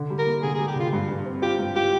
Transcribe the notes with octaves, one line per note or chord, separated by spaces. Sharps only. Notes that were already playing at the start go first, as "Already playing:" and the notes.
Already playing: D3
G3
A#4
A#3
D3 G#4
G#4
G3
G4
D3 F4
G2
G2
C4
F4 G4
G2
F4 G4